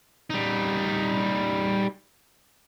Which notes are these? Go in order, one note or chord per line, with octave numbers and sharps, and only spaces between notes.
G3 D#4